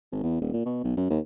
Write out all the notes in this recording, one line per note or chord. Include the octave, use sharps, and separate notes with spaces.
G#1
E2
D#1
A#2
B2
B1
F#2
D#2